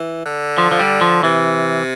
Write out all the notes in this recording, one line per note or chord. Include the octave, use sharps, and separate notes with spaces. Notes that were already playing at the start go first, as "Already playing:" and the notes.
Already playing: E3
D3
F3
F3
G3
F3
C3 E3